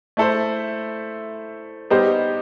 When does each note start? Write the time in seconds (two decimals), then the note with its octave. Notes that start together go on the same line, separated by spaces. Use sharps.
0.17 A3 E4 A4 C5
1.90 G3 B3 D#4 G4 C5